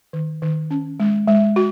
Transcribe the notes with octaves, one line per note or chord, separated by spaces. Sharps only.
D#3
D#3
C#4
G#3
G#3
F#4